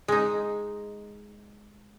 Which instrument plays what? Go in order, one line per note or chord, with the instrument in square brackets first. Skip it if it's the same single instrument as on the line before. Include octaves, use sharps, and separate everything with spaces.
[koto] G#3 D#4